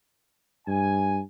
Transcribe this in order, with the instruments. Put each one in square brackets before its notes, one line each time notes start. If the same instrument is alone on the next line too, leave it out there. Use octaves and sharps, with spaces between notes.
[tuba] G2 [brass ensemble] G#5